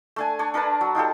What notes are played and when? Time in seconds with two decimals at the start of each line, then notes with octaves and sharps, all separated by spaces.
0.16 A3 D4 G#5
0.39 D4 C#5
0.54 D4 A#4 B4 A5
0.81 F#3
0.95 D#4 F4 G4 A4